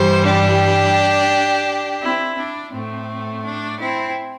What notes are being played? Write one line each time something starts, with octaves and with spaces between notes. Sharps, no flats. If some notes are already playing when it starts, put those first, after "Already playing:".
Already playing: G2 E3 G3 C5
D4 G4
C4 E4
D4
A2 A3 C4
D4
C4 E4